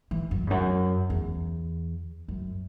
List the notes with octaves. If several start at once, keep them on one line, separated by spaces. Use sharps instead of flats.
E3
F#2
E2
F#2
E2
F#2